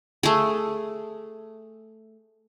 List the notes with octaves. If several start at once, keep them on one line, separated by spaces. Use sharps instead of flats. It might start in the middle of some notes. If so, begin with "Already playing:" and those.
A3 G#4